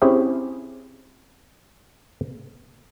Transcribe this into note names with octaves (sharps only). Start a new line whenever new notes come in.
C4 C#4 E4 G4 G#4 E5